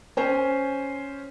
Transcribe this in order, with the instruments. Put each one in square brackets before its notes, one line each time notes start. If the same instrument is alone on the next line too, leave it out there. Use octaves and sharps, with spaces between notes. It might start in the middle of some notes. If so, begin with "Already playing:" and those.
[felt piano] C#4 C5 G#5